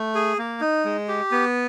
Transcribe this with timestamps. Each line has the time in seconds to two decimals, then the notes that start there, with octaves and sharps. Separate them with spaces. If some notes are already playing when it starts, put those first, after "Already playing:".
Already playing: A3
0.15 G#4
0.38 A#3
0.61 D#4
0.85 G#3
1.08 G4
1.31 B3